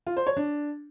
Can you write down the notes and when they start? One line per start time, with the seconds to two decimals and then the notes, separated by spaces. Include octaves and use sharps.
0.07 F4
0.17 C5
0.27 C#5
0.37 D4